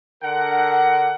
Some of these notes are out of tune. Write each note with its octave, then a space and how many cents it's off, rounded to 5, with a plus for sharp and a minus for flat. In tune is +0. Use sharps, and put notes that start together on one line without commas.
D3 +0 A#4 +0 F#5 +20